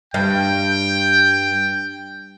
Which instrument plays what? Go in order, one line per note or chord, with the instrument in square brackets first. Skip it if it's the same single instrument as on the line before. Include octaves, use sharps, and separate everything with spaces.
[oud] G2 [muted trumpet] G5